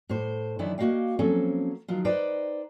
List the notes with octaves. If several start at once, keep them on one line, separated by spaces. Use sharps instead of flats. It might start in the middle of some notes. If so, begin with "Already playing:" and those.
A2 C5
F#2 D#3 E3 D4 E4
A#3 F#4 D#5 F5 G5
F3 F#3 A#3 C4 C#4 A4
D#3 F3 F#3 F4
D#4 B4 C5 D5 G5